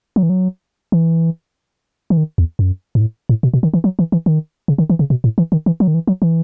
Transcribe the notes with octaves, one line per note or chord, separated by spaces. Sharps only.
F#3
E3
F#3
E3
E3
D#3
E2
F#2
G#2
A2
A2
B2
B2
D#3
E3
F#3
E3
E3
D#3
C#3
D#3
E3
C#3
B2
A2
E3
D#3
E3
F#3
D#3
E3
F#3
E3